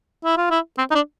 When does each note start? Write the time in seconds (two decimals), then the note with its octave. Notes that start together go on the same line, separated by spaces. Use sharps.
0.25 E4
0.37 F4
0.50 E4
0.78 C4
0.91 D#4
0.95 D4